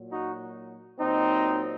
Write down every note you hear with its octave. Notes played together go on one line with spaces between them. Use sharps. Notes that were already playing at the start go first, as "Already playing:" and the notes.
Already playing: A#2 F#3
D#4 F#4
A#2 F#3 C4 D#4